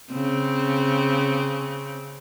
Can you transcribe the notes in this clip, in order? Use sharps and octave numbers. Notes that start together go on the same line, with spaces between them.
C#3 C4